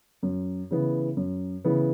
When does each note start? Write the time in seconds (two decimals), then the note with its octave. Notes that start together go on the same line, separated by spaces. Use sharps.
0.23 F#2
0.71 C#3 E3 B3
1.17 F#2
1.65 C#3 E3 B3